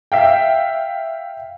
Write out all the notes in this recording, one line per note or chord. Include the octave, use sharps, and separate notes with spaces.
E5 F5 G5